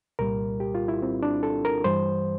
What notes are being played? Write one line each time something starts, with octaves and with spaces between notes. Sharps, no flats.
C2 A#2 G3 A#4
G4
F4
E4
C4
D4
A4
A#4
G2 E3 G3 C5